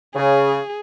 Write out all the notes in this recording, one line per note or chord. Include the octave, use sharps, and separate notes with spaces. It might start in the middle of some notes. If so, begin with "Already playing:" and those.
C#3 G#4